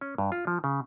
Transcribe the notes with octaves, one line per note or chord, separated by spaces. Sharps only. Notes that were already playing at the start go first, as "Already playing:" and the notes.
C#4
G2
F4
F3
C#3